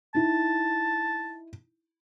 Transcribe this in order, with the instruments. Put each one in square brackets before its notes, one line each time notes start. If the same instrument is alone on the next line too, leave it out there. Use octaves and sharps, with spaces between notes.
[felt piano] D#4 E4 [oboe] A5